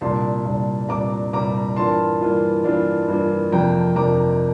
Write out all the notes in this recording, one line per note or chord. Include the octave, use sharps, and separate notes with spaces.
C2 A#2 G3 D4 A5 C6
C2 A#2 G3 D4
C2 A#2 G3 D4 A#5 D6
C2 A#2 G3 D4 A#5 D6
G2 E3 A#3 D4 F4 A5 C6
G2 E3 A#3 D4 F4
G2 E3 A#3 D4 F4
G2 E3 A#3 D4 F4
F2 C3 F3 A#3 D4 G5 A#5
F2 C3 F3 A#3 D4 A#5 D6